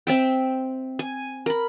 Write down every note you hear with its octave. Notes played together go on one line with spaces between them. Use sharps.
C4 E5 G5
G#5
A#4 B5